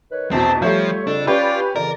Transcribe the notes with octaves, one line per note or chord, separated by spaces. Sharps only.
D#3 B4 C#5
A#1 E2 B2 C4 A5
F3 G3 A3 F4 A4 C#5 G6
F2 C#3 D4 A4
C#4 F4 G4 B4 D5
F2 C#3 E3 A#4 D5